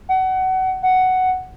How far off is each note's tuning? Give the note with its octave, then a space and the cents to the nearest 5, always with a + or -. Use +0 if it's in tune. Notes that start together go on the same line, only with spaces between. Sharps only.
F#5 +25
F#5 +5